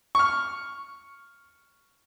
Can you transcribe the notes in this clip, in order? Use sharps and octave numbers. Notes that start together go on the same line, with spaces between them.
C#6 F6